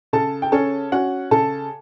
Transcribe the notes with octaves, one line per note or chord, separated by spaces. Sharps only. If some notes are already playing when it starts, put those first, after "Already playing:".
C#3 A4 A5
G5
C#4 A4 A5
C#4 F#4 F#5
C#3 A4 A5